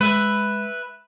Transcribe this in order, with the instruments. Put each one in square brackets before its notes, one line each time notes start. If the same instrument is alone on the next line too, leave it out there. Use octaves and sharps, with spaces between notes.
[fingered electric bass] G#3 [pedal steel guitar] B4 E5